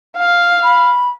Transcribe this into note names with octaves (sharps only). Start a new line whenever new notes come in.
F5
B5